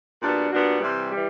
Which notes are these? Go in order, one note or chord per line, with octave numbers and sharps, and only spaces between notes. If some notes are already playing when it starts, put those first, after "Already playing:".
A#2 G3 B3 D4 F#4
A#2 G3 B3 D4 F#4
C3 E3 G3
E3 G3